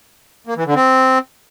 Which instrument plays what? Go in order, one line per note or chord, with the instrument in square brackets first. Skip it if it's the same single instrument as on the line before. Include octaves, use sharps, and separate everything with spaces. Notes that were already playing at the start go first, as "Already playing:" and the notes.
[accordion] A#3
E3
D3
C4